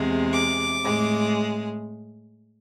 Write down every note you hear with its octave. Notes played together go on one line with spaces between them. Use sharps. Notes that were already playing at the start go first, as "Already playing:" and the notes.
Already playing: E2 C3 G#3
D6
A2 G#3